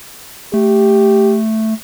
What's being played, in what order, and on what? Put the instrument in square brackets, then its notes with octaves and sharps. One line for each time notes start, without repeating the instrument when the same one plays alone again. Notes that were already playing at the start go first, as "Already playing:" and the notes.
[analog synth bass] A3 [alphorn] G4